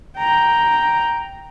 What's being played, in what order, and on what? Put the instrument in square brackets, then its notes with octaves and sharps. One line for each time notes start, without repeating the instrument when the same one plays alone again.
[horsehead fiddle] G5 A#5